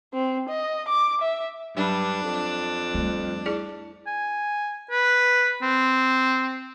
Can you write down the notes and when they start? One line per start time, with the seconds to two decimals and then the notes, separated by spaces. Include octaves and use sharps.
0.13 C4
0.48 D#5
0.88 D6
1.21 E5
1.77 G2 F#3 D4 B5
2.23 F2
2.94 G3 A3
3.46 E4 G#4 D5
4.07 G#5
4.91 B4
5.62 C4